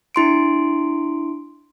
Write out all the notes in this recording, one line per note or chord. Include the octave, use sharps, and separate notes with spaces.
D4 E4 C6 D7